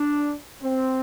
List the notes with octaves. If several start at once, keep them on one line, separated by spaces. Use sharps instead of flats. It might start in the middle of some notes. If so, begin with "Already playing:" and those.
Already playing: D4
C4